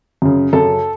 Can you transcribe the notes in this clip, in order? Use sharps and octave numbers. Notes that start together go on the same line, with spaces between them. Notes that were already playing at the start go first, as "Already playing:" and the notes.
F#2 C#3
F#2 C#3 A4